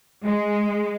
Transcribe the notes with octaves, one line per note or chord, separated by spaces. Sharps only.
G#3